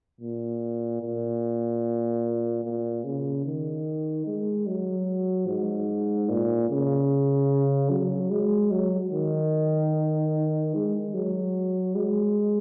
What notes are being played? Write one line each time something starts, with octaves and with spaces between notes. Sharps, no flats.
A#2
A#2
A#2
C#3
D#3
G#3
F#3
G#2
A#2
C#3
F#3
G#3
F#3
D#3
G#3
F#3
G#3